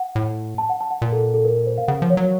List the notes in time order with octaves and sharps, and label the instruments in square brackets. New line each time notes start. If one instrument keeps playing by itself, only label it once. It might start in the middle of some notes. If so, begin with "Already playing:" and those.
Already playing: [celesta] F#5
[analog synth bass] A2
[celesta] A5
F#5
A5
F#5
[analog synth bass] A#2 [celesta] A#4
[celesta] A4
A4
A4
A#4
A#4
C5
F5
[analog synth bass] C#3 [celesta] F#5
[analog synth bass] F3
[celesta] C#5
[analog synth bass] F#3